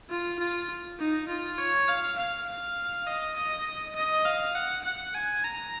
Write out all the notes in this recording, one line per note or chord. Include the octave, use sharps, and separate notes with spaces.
F4
F4
D#4
F4
C#5
F5
F5
F5
D#5
D#5
D#5
F5
F#5
F#5
G#5
A#5